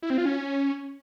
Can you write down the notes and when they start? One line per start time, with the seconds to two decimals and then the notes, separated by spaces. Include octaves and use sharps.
0.02 E4
0.10 C4
0.18 F4
0.26 C#4